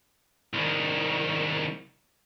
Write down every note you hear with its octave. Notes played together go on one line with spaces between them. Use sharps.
C2 D#3